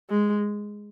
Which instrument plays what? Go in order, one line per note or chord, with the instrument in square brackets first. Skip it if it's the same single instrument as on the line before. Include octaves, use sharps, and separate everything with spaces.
[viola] G#3